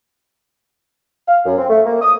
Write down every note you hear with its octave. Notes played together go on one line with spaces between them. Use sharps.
F5
F#2
C4
A3
A#3
D#6